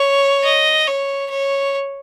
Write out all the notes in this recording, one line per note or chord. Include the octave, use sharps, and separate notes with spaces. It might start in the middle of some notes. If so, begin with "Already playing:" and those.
Already playing: C#5
D#5
C#5
C#5